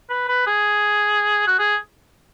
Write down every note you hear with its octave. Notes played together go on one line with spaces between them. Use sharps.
B4
B4
G#4
F#4
G#4